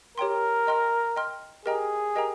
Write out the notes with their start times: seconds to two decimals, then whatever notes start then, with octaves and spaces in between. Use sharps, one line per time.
0.18 G4 A#4 C#5 G5 C6
0.67 D#5 G5 C6 F6
1.16 D#5 G5 C6 F6
1.65 G4 G#4 A#4 D#5 G5 A#5
2.15 G4 A#4 D#5 G5 A#5